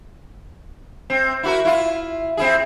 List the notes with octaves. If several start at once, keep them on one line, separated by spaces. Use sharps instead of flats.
C4
E4 F#4 A#4
E4 F4
C4 E4 G#4